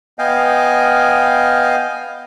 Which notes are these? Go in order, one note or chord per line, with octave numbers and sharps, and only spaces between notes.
B3 D#5 F5 G5 G#5